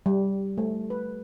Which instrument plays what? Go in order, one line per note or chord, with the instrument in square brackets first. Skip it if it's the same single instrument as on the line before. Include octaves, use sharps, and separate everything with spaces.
[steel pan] G3
A3
B4